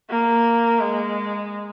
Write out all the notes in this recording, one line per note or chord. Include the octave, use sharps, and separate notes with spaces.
A#3
G#3